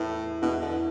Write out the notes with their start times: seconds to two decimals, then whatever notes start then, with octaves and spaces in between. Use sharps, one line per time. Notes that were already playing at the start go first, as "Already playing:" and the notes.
Already playing: E2 A2 E3 B3 E4
0.42 E2 B2 E3 B3 E4
0.61 D3